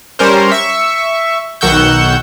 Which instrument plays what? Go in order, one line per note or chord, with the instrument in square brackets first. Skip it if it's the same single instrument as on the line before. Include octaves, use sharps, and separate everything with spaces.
[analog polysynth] G3 C#4 A#4 C5
E5 C#6
B1 D#3 F#5 C#6 E6 G6